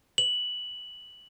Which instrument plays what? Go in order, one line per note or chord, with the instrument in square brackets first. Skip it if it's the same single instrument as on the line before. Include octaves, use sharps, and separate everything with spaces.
[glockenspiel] F#7